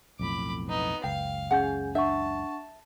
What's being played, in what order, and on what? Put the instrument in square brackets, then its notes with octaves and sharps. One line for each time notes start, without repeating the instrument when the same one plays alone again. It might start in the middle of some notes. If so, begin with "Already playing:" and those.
[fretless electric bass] B1 F2 A2 [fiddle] B5 D6
[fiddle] B3 D#4
[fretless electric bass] F#1 C#2 [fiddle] F5 [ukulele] G5
[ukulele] C#4 F#5 [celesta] G#4 G#5 G6
[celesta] D4 F#5 C#6 [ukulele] E5 [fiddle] A5